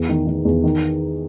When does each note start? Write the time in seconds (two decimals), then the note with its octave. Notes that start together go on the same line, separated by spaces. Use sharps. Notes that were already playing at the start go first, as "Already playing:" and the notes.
Already playing: E2
0.09 D#3
0.27 D#3
0.45 E2
0.64 D#3